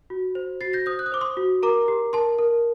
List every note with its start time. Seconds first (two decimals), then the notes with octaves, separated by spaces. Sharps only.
0.10 F#4
0.35 C5
0.61 F#4 A6 C7
0.73 G6 A#6
0.86 C5 D#6 G6
0.99 F#6
1.06 D#6
1.12 C5 D6
1.21 C6 D#6
1.37 F#4
1.63 A#4 A#5 D6
1.88 G4
2.13 A#4 A5 C6
2.39 A#4